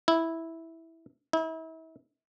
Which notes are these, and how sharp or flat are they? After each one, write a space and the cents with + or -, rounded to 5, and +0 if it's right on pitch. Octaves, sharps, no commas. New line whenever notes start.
E4 -10
E4 -40